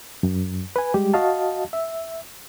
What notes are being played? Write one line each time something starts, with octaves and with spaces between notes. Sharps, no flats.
F#2
B4 G#5
G3 G#3 G4
F#4 D#5 F5 A5
E5